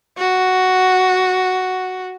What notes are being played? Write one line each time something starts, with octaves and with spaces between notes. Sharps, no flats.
F#4